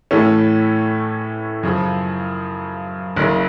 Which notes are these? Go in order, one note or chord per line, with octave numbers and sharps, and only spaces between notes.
A2 E3 A3 C#4
F#2 C#3 F3
F#1 F#2 C#3